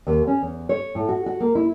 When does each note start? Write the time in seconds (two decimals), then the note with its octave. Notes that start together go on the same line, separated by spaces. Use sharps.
0.07 D#2
0.27 C#4
0.41 E2
0.69 C#5
0.95 A2
1.09 F#4
1.26 F#4
1.40 A#3
1.55 E4